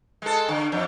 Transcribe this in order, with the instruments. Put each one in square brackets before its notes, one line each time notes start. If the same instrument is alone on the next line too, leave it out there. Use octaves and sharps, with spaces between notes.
[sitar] G#3 A4
D3
F2